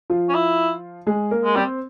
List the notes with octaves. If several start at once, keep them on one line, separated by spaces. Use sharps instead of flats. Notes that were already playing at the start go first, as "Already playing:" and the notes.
F3 F4
C#4
E4
G#3 G#4
A#3 A#4
G#3
G3 C4 C5